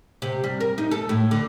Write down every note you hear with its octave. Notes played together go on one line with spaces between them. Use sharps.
C3
G3
A#4
D#4
A4
A2
D3